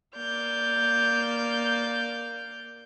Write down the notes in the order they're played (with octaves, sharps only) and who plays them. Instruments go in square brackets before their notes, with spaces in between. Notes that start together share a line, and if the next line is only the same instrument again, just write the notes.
[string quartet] A#3 D5 F6 G6